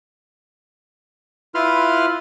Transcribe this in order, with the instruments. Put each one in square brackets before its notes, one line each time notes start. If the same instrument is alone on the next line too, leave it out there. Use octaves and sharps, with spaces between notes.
[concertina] E4 F4 B4 B5 C6 F6